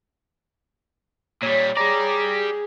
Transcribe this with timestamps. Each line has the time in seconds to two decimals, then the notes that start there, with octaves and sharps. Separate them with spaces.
1.43 A#2 G3 C#5
1.77 G4 G#4 D5 A#5